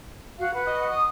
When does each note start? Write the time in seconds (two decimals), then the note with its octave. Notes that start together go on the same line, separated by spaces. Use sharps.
0.39 F#4 F5
0.52 B4 F#5
0.66 F#4 D#5
0.88 D#6